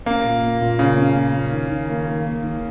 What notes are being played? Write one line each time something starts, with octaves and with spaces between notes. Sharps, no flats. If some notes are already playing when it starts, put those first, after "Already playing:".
A#3 C#4
A#2
A#2
A#2
C#3 C#4
C#4
A#2
C#4
D#3
D#3
A#3
A#3
A#3
D#3